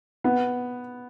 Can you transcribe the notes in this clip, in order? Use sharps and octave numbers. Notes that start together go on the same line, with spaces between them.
B3